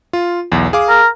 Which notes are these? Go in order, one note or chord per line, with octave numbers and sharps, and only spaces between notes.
F4
B1 E2
G#4 F5 D6
A#4